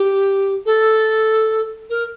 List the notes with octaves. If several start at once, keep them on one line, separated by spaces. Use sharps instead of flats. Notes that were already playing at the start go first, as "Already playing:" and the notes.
Already playing: G4
A4
A#4